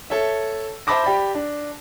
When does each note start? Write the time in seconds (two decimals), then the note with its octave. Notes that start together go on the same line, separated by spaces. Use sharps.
0.10 A4 C#5 E5
0.87 C5 E5 A5 B5 D6 A#6
1.04 G4 D5 B5
1.35 D4